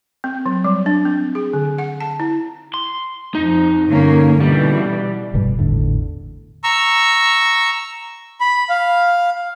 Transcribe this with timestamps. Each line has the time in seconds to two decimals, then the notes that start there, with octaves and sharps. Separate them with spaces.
0.24 C4
0.46 F#3
0.64 G3
0.86 D4
1.05 C4
1.35 G#4
1.53 D3
1.78 F#5
2.01 A5
2.20 E4
2.74 C6
3.35 F2 D#4
3.88 G2 D3 A#3 C#4
4.40 B2 E3 G3
5.34 F1 G2 B2 G3
5.59 G#1 E2 A2 D3
6.64 A#5 C#6 E6
8.40 B5
8.69 F5